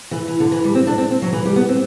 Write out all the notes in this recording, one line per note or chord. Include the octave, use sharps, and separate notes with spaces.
E3
E3
D3
E3
G3
C4
D4
C4
C4
F#3
E3
G3
B3
C4